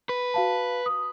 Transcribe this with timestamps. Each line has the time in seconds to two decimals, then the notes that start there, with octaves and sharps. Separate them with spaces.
0.09 B4
0.34 F#4 F5 A5
0.86 D#6